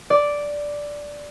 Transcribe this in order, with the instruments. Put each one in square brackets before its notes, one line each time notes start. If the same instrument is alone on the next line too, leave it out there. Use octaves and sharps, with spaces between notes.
[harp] D5